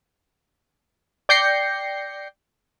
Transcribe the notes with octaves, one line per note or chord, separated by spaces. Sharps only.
D5 G5 G6 A#6 C7 C#7